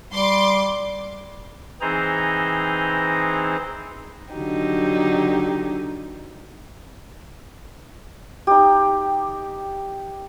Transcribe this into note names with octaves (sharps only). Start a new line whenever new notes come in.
G3 C6 D6
E3 C4 D#4 G#4 C5 A#5
D3 F#3 D#4 G4
D#4 G4